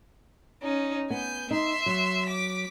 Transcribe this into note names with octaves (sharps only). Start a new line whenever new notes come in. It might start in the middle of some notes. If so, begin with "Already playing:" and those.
C#4 D#4
B3 G#5 G6
D#4 E5 C6
F#3
D6 B6